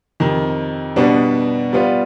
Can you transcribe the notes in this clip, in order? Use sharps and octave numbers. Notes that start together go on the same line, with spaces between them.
F2 C3 D#3
B2 G3 B3 D4
G3 B3 F4